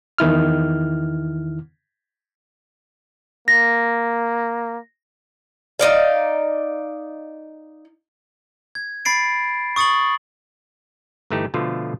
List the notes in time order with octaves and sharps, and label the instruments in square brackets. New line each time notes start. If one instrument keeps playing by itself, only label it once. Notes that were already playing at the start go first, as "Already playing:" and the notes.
[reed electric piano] E2 D#3 E4 F6
[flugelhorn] A#3 [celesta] A#6
[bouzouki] D#4 D5 F5
[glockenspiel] G#6
B5 A6 C7 D7
C#6 D#6 A6 C#7 F#7
[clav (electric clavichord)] G1 E3 A3 D#4 G4
B2 D3 F3 A3 F4